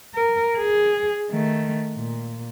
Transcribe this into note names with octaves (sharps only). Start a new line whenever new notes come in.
A#4
G#4
D#3 A3
A#2